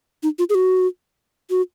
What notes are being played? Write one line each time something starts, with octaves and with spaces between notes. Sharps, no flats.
D#4
F4
G#4
F#4
F#4